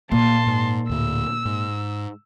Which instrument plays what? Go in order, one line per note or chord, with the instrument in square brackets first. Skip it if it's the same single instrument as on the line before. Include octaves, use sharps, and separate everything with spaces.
[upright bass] A#2 [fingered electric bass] A#3 [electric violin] A5 C6
[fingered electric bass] G#2
[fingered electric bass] D2 A2 [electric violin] E6
[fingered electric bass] G#2